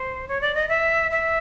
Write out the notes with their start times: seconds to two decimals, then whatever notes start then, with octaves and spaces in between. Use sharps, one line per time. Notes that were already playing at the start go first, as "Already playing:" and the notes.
Already playing: C5
0.28 C#5
0.41 D5
0.54 D#5
0.69 E5
1.11 E5